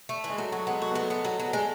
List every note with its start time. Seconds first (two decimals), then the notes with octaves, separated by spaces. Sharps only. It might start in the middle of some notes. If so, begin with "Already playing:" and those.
0.09 A3
0.24 E3
0.30 G#3
0.38 F#3 A3
0.52 F#3 F#4
0.67 G#3 B3
0.81 A3 F#4
0.91 F#3 B3
1.01 A3
1.10 B3
1.25 F#3
1.40 F#3
1.53 G#3 A3